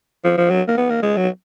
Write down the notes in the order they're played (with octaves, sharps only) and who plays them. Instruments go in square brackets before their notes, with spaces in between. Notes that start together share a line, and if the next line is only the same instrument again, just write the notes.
[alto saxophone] F3
F3
F#3
A#3
B3
A#3
G#3
F#3